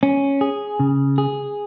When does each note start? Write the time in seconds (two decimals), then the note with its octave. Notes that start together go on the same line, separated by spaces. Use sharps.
0.03 C#4
0.41 G#4
0.80 C#3
1.18 G#4